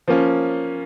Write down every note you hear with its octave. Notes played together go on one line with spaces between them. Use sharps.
F3 A#3 C#4